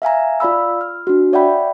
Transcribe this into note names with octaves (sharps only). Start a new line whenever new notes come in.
E5 F5 G#5 A#5
F4 D5 F5 B5 E6
F6
D4 F#4
C#5 D5 E5 F#5 G5 B5